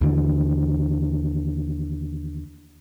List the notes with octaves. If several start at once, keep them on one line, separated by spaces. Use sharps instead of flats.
D#2 D3 E3